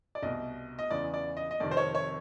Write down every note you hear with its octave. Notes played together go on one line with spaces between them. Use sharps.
D5
C2 B2 D#5
D#5
E2 C#3 E3 D5
D5
D#5
D#5
F2 C3 D#3 D5
C5
C#5
C#5